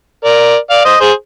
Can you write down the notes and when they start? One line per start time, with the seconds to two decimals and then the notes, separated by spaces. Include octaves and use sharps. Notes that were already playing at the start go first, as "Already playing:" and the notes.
0.24 A#4 D5
0.70 D5 F5
0.85 C5 D#5
1.01 G#4 C5